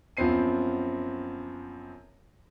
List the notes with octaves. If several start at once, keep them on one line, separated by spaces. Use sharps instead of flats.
F#2 F3 B3 C4 C7 D#7